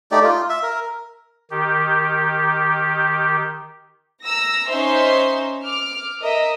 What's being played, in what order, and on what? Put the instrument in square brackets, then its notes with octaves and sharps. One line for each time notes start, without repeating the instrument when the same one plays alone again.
[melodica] A3 D#4 G4 D5
F4
E5
A#4
[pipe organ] D#3 G4
[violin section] A#5 E6 A#6
C#4 D#4 C5 E5 C6
D6 F6
A#4 D#5 E5